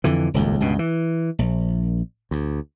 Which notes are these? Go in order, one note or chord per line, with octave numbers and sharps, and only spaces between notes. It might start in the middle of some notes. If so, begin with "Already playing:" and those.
F2 D3 E3
D#1 C#2 F#2
C#2 G2 B2
E3
A#1
D2